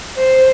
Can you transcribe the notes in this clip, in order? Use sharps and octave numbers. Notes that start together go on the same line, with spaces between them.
C5